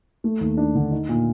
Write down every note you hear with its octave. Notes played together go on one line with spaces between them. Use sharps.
A3
D#2
D4
D3
D#4
A#2